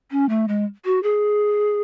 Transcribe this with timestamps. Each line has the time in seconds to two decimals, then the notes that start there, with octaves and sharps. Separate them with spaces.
0.11 C#4
0.29 A3
0.48 G#3
0.85 F#4
1.03 G#4